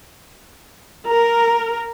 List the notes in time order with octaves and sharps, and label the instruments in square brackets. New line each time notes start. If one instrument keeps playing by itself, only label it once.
[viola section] A#4